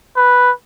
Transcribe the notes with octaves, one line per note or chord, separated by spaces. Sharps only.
B4